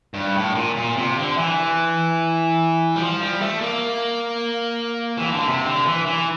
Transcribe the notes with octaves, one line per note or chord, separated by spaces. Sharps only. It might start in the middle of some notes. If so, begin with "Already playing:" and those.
G2
A2
A#2
A#2
C3
D3
E3
G3
F3
G3
A3
A#3
E3
D3
C3
D3
E3
E3